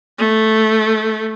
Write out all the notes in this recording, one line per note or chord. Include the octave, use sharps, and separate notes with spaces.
A3